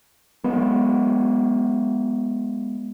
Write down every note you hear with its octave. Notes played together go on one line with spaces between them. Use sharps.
F#3 G#3 B3